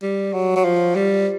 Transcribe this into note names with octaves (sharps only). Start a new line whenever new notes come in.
G3
F#3
F#3
F3
G3